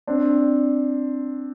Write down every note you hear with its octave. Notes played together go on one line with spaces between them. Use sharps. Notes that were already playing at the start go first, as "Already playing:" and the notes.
C4 D4